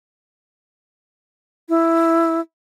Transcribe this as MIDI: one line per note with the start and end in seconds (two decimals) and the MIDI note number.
1.69 2.40 64